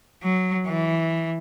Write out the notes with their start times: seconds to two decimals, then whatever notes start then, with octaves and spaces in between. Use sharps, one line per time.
0.23 F#3
0.67 E3